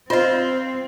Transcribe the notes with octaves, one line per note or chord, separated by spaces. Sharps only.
C4 F4 C5 D#5 F5